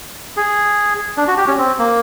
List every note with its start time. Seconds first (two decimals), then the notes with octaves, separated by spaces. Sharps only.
0.37 G#4
1.17 D4
1.27 F#4
1.37 G4
1.47 C#4
1.58 C4
1.78 A#3